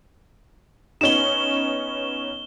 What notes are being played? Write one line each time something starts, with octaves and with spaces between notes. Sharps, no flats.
B3 C#4 D#4 E7 G7